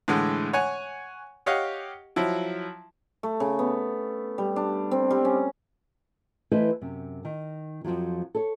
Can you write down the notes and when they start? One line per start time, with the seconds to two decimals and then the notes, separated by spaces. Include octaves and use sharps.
0.08 A2 D3 E3 G#3
0.53 C#5 F#5 G#5
1.46 G4 C#5 D#5 F5 F#5
2.16 F3 F#3 E4
3.23 A3
3.40 C#3
3.59 B3
4.38 G3
4.56 D4
4.91 C4
5.10 G3
5.25 C#4
6.51 E3 A3 E4 B4 C5 D#5
6.81 F#2 C3
7.25 D#3
7.84 F2 B2 F3 F#3
8.35 A4 C#5